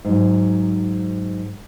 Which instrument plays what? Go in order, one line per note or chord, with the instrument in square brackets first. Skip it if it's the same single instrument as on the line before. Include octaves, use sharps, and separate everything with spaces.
[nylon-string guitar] G#2 F#3